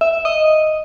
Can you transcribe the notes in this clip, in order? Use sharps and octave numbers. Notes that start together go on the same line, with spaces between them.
E5
D#5